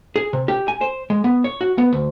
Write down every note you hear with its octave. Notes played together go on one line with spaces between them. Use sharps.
G#4
C3
G4
G#5
C5
G#3
B3
C#5
F#4
B3
D2